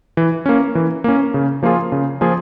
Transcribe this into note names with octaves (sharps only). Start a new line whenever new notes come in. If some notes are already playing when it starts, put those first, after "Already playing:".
E3
A#3 C#4
E3
A#3 C#4
C#3
F3 A#3 F4 G#4
C#3
F3 A#3 F4 G#4